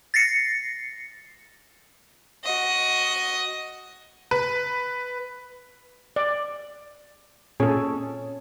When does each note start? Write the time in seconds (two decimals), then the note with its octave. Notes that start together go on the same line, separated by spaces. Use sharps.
0.14 A6 A#6 C7 C#7
2.44 F#4 D#5
4.31 B4
6.16 D5
7.60 A#2 C#4 G#4 A4